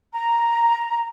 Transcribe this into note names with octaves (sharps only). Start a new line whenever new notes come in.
A#5